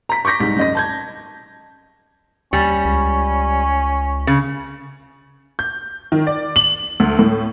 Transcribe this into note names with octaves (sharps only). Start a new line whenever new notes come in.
A#5 B6
C#6 D6 G6 A#6 B6
C2 G#2 B6
F#2 D#5 A#6
A5 G6 G#6
D#2 G3 C#4
C#2
C#3
G6
D#3
D5
F#7
D2
A2